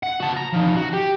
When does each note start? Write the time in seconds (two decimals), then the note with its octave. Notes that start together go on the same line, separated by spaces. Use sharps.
0.03 F#5
0.20 F#4 A5
0.36 A#5
0.53 F3 D#4
0.76 F#4
0.93 G4